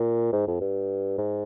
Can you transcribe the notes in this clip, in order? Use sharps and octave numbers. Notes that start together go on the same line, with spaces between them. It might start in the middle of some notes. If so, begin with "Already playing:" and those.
Already playing: A#2
G#2
F2
G2
G#2